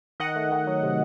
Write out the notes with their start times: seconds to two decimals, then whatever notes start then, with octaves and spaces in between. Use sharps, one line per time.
0.20 D#3 D#5 F#5
0.36 A3
0.51 D#3
0.67 F#3
0.83 C3